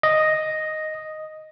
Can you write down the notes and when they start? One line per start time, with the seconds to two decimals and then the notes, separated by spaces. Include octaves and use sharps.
0.03 D#5